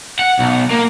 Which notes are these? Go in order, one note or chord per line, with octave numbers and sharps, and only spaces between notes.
F#5
B1
A#3